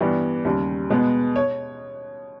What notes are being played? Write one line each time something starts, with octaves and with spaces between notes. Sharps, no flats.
G2 E3 G3 B3
D#2 C#3 G3
B2 G#3 B3
C#5